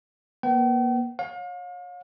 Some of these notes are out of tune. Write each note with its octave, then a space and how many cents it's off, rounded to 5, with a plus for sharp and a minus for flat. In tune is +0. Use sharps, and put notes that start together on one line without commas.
A#3 +35 B4 +35 G5 -45
C#5 +0 F5 +40